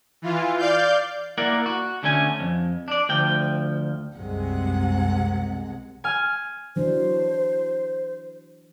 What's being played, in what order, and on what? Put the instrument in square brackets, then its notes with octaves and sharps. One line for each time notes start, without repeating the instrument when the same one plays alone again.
[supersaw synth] E3 F4
D5 F5 G6
[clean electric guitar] A#3 E4 A#4 D5 F#5
F#4
D2 D3 A3 C#4 G#5
F2
D4 D5
D2 F3 G5
[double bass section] C2 F#2 G#3 [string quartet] C3 F#5
[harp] G#5 F6
[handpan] E3 F#3 D4 [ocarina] C5